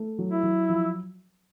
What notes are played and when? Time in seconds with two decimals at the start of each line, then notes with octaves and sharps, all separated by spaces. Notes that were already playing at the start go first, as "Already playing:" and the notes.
Already playing: A3
0.19 F#3
0.31 E4
0.43 F#3
0.69 F3